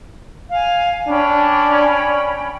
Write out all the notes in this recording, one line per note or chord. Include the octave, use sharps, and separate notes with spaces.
F5 G#5
C#4 D4 G5 B5